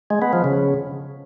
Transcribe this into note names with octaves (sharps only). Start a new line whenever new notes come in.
G#3
B3
F3
C#3